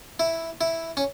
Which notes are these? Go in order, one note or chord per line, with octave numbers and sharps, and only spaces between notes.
E4
E4
C#4